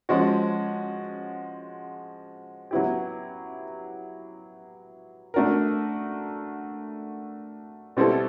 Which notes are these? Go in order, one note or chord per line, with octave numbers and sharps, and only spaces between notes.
F3 G#3 C#4 F#4
F#3 B3 E4 G4
A3 D4 F#4 A#4
B2 G3 C4 E4 A4